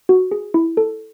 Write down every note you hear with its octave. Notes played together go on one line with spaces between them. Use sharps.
F#4
G#4
E4
A4